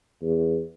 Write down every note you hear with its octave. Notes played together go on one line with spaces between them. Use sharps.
E2